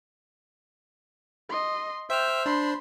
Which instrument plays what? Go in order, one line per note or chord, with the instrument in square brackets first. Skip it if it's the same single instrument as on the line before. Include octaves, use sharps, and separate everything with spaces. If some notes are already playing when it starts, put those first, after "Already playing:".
[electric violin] D#5 C6
[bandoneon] C5 [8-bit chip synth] E5 E6 F6 [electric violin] G5
[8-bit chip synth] D4 [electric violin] B5 C6